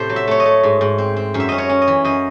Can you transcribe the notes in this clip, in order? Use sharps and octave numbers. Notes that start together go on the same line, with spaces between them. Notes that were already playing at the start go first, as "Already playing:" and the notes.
Already playing: A2 C3 A4 C5
F#3
E5
A3 C#5
D#5
A3
G#2
G#2
C4
C4
F#2
E5
C#4 D#5
C#5
C#4
D#5
E3
F#2 D#5